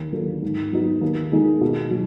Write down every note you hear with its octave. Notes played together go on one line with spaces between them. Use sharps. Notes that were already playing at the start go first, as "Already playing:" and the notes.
Already playing: D#2
D3 F#3 A#3 F4
G#2
F#3 B3 D#4 F#4
D#2
D#3 G#3 D#4 G#4
B2
F#3